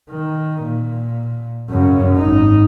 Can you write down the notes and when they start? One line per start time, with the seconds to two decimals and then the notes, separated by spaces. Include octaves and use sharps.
0.10 D#3
0.63 A#2
1.70 F#2 C#3
2.15 G#1 D#4